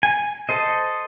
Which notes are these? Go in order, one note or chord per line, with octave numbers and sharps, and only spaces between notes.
G#5
A4 C5 D#5